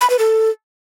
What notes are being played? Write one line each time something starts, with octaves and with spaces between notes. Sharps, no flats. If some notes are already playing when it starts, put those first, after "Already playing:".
B5
B4
A4